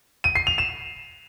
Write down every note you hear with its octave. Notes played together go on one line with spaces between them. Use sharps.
D#7
C7
F7
E7